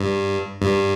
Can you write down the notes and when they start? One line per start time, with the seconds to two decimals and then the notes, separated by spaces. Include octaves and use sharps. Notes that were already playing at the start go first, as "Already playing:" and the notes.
Already playing: G2
0.61 G2